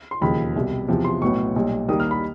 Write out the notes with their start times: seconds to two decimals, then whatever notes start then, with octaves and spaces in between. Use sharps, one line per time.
0.11 C6
0.21 E1 D#2 C#3 F3 B5
0.56 C2 B2 G3
0.88 E2 C3 F3
1.05 C6
1.21 B1 A2 F#3 B3 C#6
1.56 B1 A#2 G3
1.88 D#2 D#3 G3 A#3 D#6
2.00 F6
2.11 B5